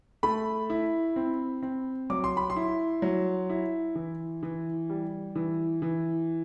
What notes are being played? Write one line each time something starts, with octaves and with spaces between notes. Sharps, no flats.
A3 B5
E4
C4
C4
F#3 D6
C6
B5
C6
E4
F#3
E4
E3
E3
G3
E3
E3